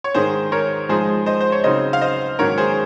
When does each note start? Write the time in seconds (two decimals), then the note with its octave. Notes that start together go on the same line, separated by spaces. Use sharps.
0.04 C#5
0.14 G#2 D#3 G#3 G#4 C5
0.52 A#4 C#5
0.89 G#2 F3 G#3 D#4 G#4 C5
1.26 C5 D#5
1.40 C5
1.52 C#5
1.64 C#3 F#3 C4 D#4 C5 D#5
1.93 F5
2.01 C5 D#5
2.39 G#2 D#3 F#3 A#3 C#4 A#4 C#5
2.58 G#4 C5